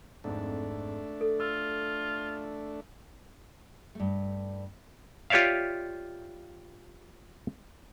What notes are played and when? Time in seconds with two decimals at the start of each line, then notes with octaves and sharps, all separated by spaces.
0.24 G#1 F2 G#2 A3 D4
1.21 A4
1.40 F4 E6
3.95 G2 A3
5.30 F4 G4 C#5 D5 E5 F5